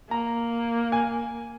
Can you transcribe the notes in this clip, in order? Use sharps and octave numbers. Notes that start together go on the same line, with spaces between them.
A#3 A#5
G#5